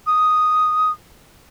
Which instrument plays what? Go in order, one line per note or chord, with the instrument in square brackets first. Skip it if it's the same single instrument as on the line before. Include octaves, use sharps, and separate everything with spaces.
[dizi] D#6